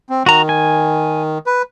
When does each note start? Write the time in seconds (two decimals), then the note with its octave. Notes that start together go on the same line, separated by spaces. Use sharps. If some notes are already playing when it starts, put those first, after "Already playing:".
0.10 C4
0.26 D#3 F#4 A#5
0.49 G#5
1.46 B4